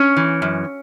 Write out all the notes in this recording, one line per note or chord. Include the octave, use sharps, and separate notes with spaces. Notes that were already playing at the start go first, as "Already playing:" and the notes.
Already playing: C#4
E3
F#2